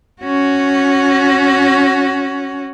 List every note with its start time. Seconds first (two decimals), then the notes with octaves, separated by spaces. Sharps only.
0.22 C#4 F#4